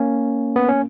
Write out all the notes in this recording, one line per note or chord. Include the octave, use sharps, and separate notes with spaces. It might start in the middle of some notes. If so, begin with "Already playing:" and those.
Already playing: A#3 C#4
B3
C#4